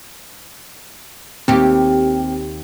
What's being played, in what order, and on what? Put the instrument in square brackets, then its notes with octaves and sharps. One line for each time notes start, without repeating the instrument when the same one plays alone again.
[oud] D#2 G4 [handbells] C4